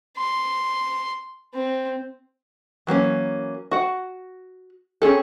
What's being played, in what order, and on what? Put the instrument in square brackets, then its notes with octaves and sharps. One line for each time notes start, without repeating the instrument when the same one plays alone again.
[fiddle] C6
C4
[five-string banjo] E3 F#3 A#3 C#4
F#4 F#5
C4 C#4 G#4 A4